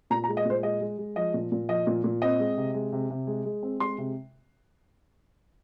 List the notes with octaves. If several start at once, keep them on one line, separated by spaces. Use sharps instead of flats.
A#2 A#5
A#5
G#3
D#5
A#2 C5
G#3 D#5
G#3
G#3
F3 D#5
A#2
A#2
F3 D#5
A#2
A#2
C4 D#5
G#3
C3
G#3
C3
C3
G#3
G#3
C4
G#3 C6
C3